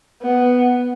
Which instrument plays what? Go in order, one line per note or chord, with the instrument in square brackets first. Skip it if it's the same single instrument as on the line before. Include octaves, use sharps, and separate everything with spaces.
[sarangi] B3